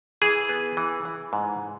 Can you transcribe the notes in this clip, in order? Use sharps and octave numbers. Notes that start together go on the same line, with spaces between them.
E3 G#4
B3
E3
E3
G#2